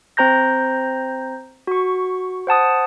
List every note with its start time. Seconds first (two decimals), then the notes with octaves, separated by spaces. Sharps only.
0.17 C4 C5 A#5 G6 A#6
1.67 F#4 C#6
2.47 C5 F#5 A5 D#6